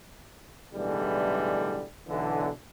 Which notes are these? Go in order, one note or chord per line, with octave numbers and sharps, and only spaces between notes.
B1 A2 D3 E3 G3 G#3
B1 D3 E3